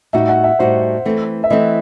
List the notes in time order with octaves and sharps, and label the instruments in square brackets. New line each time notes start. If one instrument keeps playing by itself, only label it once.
[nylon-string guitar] A2 G3 D#4 F#4 [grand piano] E5
[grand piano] F#5
E5
[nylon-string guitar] A2 G3 D#4 F#4 [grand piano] C5
[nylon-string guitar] E3 A3 C4
[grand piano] E5
[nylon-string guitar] E3 A3 C4 [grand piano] D#5